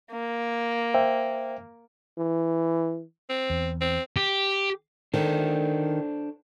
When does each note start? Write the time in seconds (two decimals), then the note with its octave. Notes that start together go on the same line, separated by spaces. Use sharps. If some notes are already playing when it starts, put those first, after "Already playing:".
0.12 A#3
0.94 C5 E5 G5
2.18 E3
3.30 C4
3.50 E2
3.81 C4
4.16 G4
5.14 D#3 D4 A4 C5